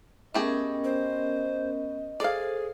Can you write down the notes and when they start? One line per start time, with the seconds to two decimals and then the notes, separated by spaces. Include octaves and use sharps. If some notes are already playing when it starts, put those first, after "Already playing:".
0.34 A3 B3 C#4 G4 G#4 A#4 D#5
0.84 C5
2.20 G#4 A4 C5 D5 F5